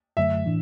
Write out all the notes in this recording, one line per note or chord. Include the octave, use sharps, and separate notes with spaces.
F#2 D3 F#3 A3 E5
A2 E3 D4